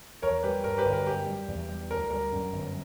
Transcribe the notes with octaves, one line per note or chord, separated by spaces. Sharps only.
E2 A#4 C#5
G3 G4 B4
G2 A#4
G4 B4
G1
A#4
F#2 G4
G3
E2
G3
D2 A#4
G3 A#4
F#2
G1